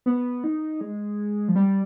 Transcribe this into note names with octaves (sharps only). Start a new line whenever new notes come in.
B3
D#4
G#3
F3
G3